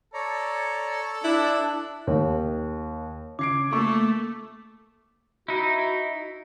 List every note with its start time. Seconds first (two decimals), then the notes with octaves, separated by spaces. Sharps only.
0.14 A4 C#5 D5 A#5
1.24 D4 E4 F#6
2.07 D#2
3.39 C#3 D6 G#6 C7 D7
3.73 A3 A#3 C#6 E6
5.48 D#4 E4 F#4